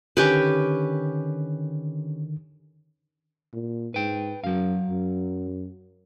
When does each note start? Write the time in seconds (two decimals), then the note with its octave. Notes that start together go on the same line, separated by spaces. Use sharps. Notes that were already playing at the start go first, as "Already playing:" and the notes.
0.17 D3 D#3 C#4 G4 B4
3.53 A#2
3.94 G#2 B4 G5
4.44 F#2 F#3 F5
4.90 F#2